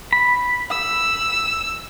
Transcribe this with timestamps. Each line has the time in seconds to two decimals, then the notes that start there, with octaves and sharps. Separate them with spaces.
0.13 B5
0.71 E6